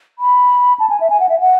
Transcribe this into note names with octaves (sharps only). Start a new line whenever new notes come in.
B5
A5
G#5
E5
G#5
F#5
E5
F#5